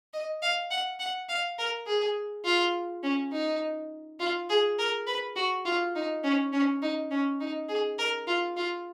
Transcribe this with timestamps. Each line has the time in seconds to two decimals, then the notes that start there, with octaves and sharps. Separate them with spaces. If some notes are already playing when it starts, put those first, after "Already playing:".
0.13 D#5
0.42 F5
0.71 F#5
0.99 F#5
1.29 F5
1.59 A#4
1.87 G#4
2.45 F4
3.03 C#4
3.32 D#4
4.20 F4
4.50 G#4
4.79 A#4
5.07 B4
5.36 F#4
5.65 F4
5.95 D#4
6.24 C#4
6.53 C#4
6.82 D#4
7.11 C#4
7.40 D#4
7.69 G#4
7.99 A#4
8.27 F4
8.57 F4